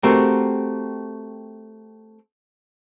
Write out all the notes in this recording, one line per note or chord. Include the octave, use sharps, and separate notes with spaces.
A3 C4 F#4 G4 A#4